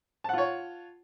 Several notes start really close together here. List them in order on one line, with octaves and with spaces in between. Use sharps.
A5 F#5 F4 C#5